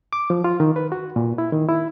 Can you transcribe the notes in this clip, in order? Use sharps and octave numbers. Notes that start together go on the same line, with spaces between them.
D6
F3
F4
D#3
B4
F#4
A#2
E4
D#3
E4